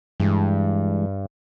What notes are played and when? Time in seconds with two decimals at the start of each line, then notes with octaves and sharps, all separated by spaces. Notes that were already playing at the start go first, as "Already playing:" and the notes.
0.20 G2 E3 G#3